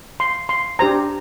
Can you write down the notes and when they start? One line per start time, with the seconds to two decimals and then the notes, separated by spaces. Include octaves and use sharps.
0.20 C6
0.49 C6
0.79 D4 G4 C5 A#5